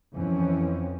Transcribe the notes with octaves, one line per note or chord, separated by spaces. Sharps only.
F2 E3 F3 C4 C#4